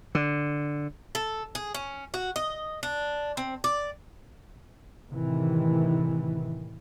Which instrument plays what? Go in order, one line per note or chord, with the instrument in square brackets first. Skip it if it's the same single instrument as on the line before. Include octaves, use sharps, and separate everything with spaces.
[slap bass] D3
[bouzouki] A4
G#4
C#4
F#4
D#5
D4
C4
D5
[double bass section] A2 C3 D#3 E3